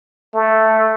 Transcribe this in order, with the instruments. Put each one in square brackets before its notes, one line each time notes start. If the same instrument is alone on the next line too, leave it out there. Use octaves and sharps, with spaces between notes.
[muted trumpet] A3